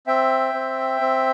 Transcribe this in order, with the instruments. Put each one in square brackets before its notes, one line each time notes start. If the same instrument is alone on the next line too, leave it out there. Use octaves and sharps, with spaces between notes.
[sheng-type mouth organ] C4 E5 G5
C4
C4